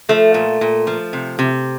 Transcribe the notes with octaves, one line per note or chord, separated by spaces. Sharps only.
F3 A3
A#2
A#2
F3
C3
C3